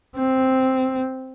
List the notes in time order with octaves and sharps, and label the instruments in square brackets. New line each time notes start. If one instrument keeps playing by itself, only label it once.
[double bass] C4